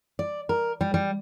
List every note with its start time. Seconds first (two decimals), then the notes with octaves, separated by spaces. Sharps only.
0.19 D5
0.49 A#4
0.81 G3
0.94 G3